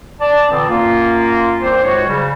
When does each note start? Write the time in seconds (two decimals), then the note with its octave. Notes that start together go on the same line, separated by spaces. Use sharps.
0.20 D5 A5
0.50 A#2 D3 E3 B3 C4
0.69 F#2 A#3 F4
1.61 C2 D#3 C4 D4 C5
1.83 C#2 G#2 F#4 C#5
2.07 C#3 F#3 G3